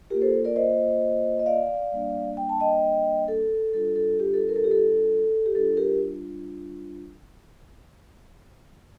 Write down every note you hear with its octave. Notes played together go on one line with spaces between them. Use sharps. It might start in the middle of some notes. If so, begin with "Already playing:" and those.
A#3 F4 G4 A#4
A4 C5
A#4 D5
C5 D#5
D#5
D5 F5
G3 A#3 D4
G5
A5
D#5 G5
A4
G3 D4 F4 A4
A4
G4
A4
A#4
A4
G4
A4
G4
G3 D4 F4 A4
G4 A#4